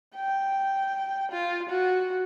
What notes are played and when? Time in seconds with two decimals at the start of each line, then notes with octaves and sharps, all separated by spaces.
0.15 G5
1.32 F4
1.70 F#4